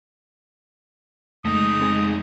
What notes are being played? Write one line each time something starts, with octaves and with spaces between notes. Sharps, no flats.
F2 G#3 A3 D#4 D#6
C4 G#4 G#5